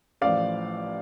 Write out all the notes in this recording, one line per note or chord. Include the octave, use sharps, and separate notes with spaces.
A1 A2 F3 D5 F5